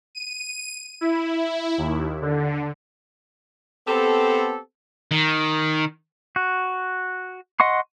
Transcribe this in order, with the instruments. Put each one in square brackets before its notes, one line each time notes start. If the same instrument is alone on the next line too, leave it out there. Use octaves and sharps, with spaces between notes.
[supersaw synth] D#7
E4
D#2
D3
[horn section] B3 C4 G4 A4
[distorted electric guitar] D#3
[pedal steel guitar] F#4
D#5 F#5 C6 C#6